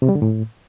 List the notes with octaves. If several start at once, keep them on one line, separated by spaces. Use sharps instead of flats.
C3
G3
D3
A2